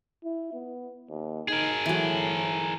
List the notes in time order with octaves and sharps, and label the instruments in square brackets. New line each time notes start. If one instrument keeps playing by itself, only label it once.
[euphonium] E4
B3
D#2
[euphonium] D#4 [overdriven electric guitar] G#4 A#4
[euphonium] A2 [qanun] E3 F#3